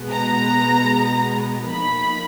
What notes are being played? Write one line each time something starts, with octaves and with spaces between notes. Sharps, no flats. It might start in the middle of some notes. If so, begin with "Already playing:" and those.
Already playing: B2 G#3 B3
A#5
F3 A#3 D#4 B5